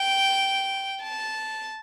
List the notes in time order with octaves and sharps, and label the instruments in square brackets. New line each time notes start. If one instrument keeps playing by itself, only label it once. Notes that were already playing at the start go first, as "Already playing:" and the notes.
Already playing: [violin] G5
A5